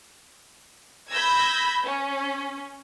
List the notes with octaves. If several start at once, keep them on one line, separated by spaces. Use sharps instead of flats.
B5 E6 G6 G#6 A#6
C#4